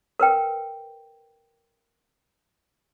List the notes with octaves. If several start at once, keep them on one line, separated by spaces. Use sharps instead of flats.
A#4 B4 G5